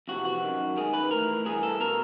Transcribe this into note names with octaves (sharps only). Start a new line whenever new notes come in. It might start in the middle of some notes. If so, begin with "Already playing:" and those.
F2 C3 E3 F#4
F#4
F#2 D#3
G#2 D#3 G#4
B4
A2 E3 A#4
G2 E3 G#4
A4
B2 A#4